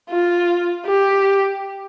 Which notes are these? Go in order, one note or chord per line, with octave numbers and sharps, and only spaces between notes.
F4
G4